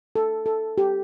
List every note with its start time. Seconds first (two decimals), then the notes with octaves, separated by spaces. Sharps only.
0.16 A4
0.46 A4
0.78 G4